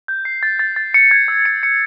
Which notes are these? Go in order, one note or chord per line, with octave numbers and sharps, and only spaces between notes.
G6
C7
A6
A6
A6
C#7
G#6
E6
C#7
C#7